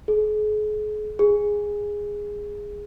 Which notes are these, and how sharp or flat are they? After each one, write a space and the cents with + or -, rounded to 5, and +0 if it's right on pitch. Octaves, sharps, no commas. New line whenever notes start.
G#4 +40
G#4 -10